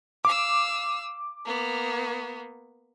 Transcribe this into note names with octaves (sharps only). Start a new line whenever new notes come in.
F5 D6 E6
A#3 B3